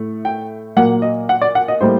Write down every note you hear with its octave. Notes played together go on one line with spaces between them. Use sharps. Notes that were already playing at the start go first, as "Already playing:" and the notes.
Already playing: A2 A3
G5
A#2 F#3 A#3 F#5
D#5
F#5
D5
F#5
D#5
A2 G3 A#3 C5